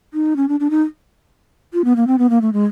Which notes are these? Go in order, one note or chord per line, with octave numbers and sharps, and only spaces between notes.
D#4
C#4
D4
D4
D#4
F4
B3
A#3
C4
B3
A#3
A3
G#3